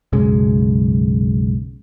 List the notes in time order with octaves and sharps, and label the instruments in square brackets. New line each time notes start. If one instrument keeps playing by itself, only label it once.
[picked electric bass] B1 F#2 C#3 G#3